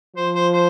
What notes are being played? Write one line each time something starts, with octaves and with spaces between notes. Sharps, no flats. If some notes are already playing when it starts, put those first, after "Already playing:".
F3 C5
C5
C5